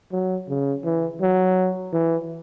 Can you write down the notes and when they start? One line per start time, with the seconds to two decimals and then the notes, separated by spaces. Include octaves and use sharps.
0.12 F#3
0.49 C#3
0.85 E3
1.21 F#3
1.93 E3